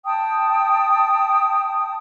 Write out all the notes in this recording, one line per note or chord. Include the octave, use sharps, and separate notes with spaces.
G5 A5 D#6